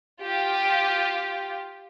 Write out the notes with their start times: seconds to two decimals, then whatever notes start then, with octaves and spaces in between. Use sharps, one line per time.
0.21 F4 G4